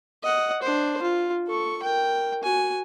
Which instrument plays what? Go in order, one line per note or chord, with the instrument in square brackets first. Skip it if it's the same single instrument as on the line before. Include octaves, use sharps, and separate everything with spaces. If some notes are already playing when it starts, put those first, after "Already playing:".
[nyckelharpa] D#5 F#5
D4 C5
F4
A4 C#6
A#4 G5
F#4 G#5